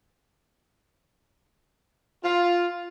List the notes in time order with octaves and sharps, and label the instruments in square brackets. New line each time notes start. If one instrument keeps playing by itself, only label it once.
[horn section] F4